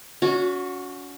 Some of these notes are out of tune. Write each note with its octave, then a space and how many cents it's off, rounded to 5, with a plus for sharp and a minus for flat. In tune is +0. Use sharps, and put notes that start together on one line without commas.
C#4 +35 F#4 -15